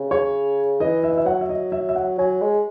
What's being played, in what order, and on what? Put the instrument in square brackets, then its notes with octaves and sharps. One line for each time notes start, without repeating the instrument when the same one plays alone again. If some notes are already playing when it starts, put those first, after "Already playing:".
Already playing: [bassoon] C#3
[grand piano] C#5
[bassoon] E3 [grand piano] D#5
[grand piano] E5
D#5
E5
[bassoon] F#3 [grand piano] F#5
[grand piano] E5
D#5
E5
E5
F#5
[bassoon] F#3 [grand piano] G#5
[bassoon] G#3